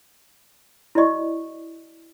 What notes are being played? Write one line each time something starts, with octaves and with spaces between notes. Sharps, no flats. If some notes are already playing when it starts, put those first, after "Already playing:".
E4 F#4 D5 D#5 C#6